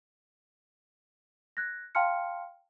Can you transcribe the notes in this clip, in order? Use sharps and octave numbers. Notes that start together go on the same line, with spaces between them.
F#6 G#6 A#6
F5 G5 A5 C6 F6 C#7